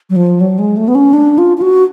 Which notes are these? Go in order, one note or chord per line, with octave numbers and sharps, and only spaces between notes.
F#3
F3
F#3
G#3
A3
B3
C#4
D4
F4
F4
F#4